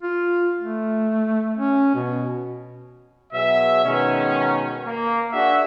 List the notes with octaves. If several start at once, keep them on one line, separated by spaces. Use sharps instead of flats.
F4
A3
C#4
B2
B2 F#3 G#4 E5
B2 D#3 G#3 C#4
A#3
D4 F#4 G#4 E5